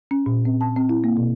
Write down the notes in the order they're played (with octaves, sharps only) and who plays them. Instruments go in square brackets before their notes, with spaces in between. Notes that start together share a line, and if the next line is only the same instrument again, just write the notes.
[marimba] C#4
A#2
C4
A5
C4
E4
A#3
B2